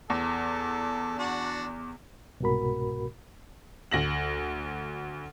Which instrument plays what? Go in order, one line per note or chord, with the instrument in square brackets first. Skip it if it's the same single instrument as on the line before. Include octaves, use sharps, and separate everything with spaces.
[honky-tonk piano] E2 [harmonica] A4
[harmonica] D4 F#4 F#5
[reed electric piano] C2 G#2 B2 F#4 A#4 B5
[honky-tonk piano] D2 A#6 F#7